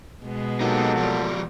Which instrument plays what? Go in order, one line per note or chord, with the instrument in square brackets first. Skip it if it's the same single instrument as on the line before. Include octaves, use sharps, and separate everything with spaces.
[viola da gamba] B2 G#3 B3
[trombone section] F#3 A#3 A4 [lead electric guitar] D#4 G4
[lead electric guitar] F3 G3